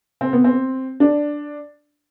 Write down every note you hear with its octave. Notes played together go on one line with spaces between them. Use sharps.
C4
B3
C4
D4